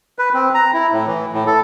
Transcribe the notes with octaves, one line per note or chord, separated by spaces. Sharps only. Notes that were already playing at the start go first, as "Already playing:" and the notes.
B4
C4
A#5
E4
A2
E3
A2
A4